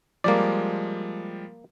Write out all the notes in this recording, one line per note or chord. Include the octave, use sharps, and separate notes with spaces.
F3 G3 G#3 A#3 D5